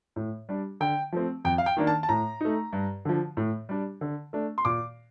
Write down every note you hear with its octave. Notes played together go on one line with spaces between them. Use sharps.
A2
G3 D4
D3 G5
F3 A3 C4
F2 G5
F5
G5
D#3 A#3 D4
A5
A5
A2 A#5
A3 D#4
G2
D3 F3
A2
G3 D4
D3
A3 D4
C6
A#2 D6